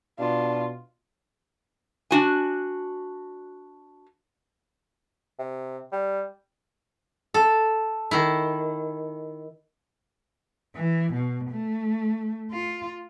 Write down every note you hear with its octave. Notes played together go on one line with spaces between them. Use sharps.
B2 D4 F4
D4 F#4 G#5
C3
G3
A4
D#3 E4
E3
B2
A3
F4